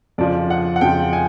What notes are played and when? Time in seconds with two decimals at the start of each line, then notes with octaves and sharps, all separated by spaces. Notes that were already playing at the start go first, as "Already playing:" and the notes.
0.18 F2 C#3 F3 D5
0.50 F#5
0.76 F#5
0.81 F2 C#3 F3 G5
1.13 G#5